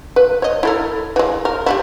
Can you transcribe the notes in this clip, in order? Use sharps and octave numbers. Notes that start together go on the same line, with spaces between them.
B4
C#5 D#5
E4 A4 A#4
E3 G#3
A#4
G3 D4 E4